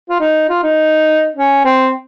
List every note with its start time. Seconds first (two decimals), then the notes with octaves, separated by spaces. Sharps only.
0.10 F4
0.20 D#4
0.50 F4
0.63 D#4
1.36 C#4
1.65 C4